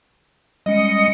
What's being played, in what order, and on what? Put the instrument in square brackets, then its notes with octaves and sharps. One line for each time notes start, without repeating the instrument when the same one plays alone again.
[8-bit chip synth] G3 G#3 C#4 [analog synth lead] D#5 [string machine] C#7